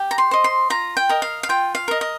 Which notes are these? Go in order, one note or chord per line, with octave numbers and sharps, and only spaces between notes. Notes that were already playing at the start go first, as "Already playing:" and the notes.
Already playing: G4
A#5
C6
C5 D#5
C6
F4 A#5
G5
A#4 D#5
F5
F5
F4 G5
F5
A#4 D#5
D#5